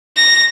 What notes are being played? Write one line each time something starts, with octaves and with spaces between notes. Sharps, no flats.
A#6